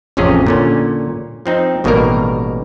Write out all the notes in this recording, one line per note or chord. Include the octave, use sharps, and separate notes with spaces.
A1 F2 C3 C#4 G#4
A#2 D3 C#4
F3 C4 D#4
A1 B2 D#3 G3 A#3 A#4